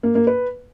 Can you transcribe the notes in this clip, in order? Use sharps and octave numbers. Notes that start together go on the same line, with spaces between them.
A#3
A#3
B4